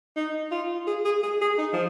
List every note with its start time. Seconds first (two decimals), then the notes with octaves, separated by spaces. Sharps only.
0.16 D#4
0.51 F4
0.87 G#4
1.05 G#4
1.23 G#4
1.42 G#4
1.58 D#4
1.73 F3